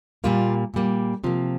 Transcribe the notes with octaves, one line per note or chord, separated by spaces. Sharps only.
A#2 G3 A#3 F4
A#2 G3 A#3
C3 F3 A#3